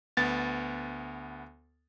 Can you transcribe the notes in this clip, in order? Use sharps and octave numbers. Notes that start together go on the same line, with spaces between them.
D2 B3 A6